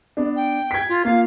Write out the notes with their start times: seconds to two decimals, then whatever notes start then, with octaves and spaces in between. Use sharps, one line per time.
0.17 B3 D4
0.36 G5
0.71 G#6 B6
0.89 F4
1.05 A#3 F4 F5